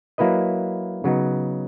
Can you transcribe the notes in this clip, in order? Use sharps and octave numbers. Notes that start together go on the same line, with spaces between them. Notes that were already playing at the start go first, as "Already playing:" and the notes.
F#3 A#3 E4 B4 D#5
C#3 F#3 B3 D#4